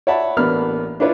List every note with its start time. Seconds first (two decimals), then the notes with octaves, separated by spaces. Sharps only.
0.07 C#5 D5 E5 F#5 A5 B5
0.37 A1 A#3 B3 D4 B5 F6
1.00 D4 E4 F4 B4 C#5